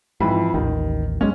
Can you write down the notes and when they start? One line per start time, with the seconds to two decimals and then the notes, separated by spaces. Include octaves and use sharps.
0.20 F2 G#2 E3 B5
0.54 A1 D#2 D#3
1.21 G2 G#3 A#3 C#4